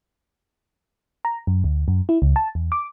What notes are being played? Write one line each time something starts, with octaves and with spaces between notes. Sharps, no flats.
A#5
F#2
D2
F#2
E4
C#2
A5
E2
D6